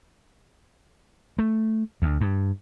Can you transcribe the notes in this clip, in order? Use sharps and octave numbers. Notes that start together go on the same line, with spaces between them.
A3
D2
G2